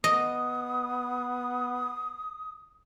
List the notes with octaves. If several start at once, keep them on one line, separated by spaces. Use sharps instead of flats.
B3 D#5 D#6